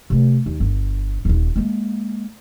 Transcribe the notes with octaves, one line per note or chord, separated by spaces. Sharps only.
C3 A3
D#2
G1
D#1 D#2
G#3 A#3